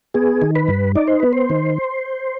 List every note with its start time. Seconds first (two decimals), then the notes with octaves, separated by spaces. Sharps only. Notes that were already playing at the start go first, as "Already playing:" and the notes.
0.14 B3 G#4
0.42 D#3
0.55 B4
0.68 G2
0.96 D#4 D5
1.07 C5
1.20 B3 B4
1.33 C5
1.50 D#3